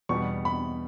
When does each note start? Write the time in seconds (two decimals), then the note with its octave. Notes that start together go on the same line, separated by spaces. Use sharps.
0.09 E2 B2 G3 B3 C#6
0.45 B5